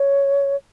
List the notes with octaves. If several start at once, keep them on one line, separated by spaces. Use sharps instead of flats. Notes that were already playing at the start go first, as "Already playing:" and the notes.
Already playing: C#5